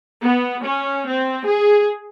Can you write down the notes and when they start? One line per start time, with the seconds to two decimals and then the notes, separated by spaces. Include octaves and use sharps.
0.23 B3
0.62 C#4
1.08 C4
1.44 G#4